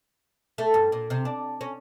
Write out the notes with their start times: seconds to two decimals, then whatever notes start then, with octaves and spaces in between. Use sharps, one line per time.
0.58 A3
0.74 G2
0.92 A#2
1.10 C3
1.25 D4
1.61 C#4